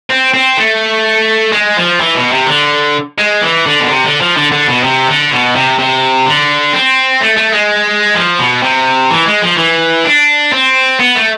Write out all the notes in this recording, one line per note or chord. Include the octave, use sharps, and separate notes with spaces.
C4
C4
A3
G#3
F3
E3
B2
C3
D3
G#3
E3
D3
B2
C3
D3
F3
D3
D3
B2
C3
D3
B2
C3
C3
D3
C4
A3
A3
G#3
F3
B2
C3
E3
G#3
F3
E3
D4
C4
B3
A3